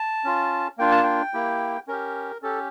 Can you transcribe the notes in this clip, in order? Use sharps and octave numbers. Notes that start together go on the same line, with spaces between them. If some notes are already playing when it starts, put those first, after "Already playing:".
Already playing: A5
C#4 F4
A#3 D4 F4 G5
A5
G5
A#3 E4 G4
C#4 G4 A#4
C#4 G4 A4